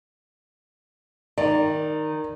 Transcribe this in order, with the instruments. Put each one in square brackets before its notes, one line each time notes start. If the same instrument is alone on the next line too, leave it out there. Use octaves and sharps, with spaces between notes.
[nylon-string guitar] D#3 [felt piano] D5